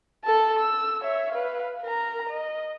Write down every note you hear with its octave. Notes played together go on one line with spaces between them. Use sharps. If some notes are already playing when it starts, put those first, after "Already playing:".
A4 A5
E6
C#5 E5
B4 F5
A#4 A#5
D#5